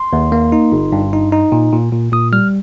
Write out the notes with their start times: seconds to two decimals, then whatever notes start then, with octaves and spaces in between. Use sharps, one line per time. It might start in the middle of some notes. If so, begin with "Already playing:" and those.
Already playing: C6
0.13 D#2
0.32 A#3
0.52 D#4
0.72 G1
0.92 G2
1.13 D#4
1.32 D#4
1.52 A#2
1.72 A#2
1.92 A#2
2.12 A#2 D#6
2.33 G3 F6